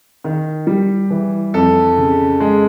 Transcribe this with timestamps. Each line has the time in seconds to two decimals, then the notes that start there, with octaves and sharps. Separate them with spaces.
0.24 D#3
0.67 G3
1.10 E3
1.54 F2 A4
1.98 C#3
2.40 G#3